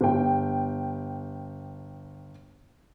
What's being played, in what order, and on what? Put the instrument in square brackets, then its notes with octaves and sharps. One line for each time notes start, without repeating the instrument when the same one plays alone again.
[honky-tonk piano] G1 G5